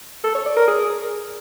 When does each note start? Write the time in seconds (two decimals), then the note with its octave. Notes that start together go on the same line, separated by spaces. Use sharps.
0.24 A4
0.35 C#5
0.46 D5
0.57 A#4
0.67 G#4